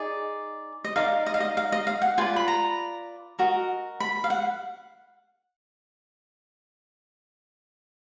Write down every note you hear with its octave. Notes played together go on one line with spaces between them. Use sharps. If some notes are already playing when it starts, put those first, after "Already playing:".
Already playing: D#4 G#4 D5
D#5
D#4 A#4 D5 F5
D#5
F5
D#5
F5
D#5
F5
F#5
F4 B4 D5 G#5
B5
A#5
F#4 A#4 D#5
B5
F5
F#5